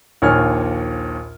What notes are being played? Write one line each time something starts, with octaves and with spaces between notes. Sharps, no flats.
A#1 D#2 C#5 G#5 F6